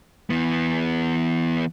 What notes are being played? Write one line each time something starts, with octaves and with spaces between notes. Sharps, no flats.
E3 B3